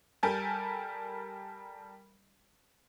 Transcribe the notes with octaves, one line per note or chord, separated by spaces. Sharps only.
G3 A4 A#4 G#5 G6